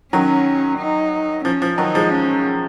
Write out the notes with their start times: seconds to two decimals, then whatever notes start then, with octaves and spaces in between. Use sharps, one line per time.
0.13 D#3 F#3 C#4
0.79 D#4
1.45 F3 C#4
1.62 F3
1.78 D#3 F#3 D#4
1.95 F3 G#3
2.11 C#4